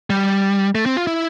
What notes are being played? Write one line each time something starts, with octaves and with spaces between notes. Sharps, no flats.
G3
A3
C4
F4
E4